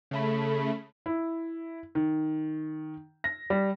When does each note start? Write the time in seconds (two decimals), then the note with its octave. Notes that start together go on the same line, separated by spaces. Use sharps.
0.11 C#3 A3 B5
1.06 E4
1.95 D#3
3.24 A#6
3.50 G3